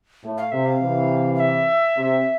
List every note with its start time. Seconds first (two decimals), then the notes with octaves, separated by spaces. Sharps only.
0.24 A2
0.38 F5
0.52 C3 E5
0.66 F5
0.81 C3 E3
1.35 F5
1.40 E5
1.97 C3